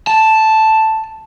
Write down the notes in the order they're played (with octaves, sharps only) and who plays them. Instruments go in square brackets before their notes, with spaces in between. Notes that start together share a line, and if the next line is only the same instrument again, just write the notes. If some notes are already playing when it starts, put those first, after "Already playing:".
[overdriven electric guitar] A5